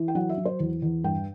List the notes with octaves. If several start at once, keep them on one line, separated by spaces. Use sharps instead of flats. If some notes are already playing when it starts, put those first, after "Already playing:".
Already playing: E3
G5
F#3 F#5
E5
F#3
C5
E2
E2
G2 G5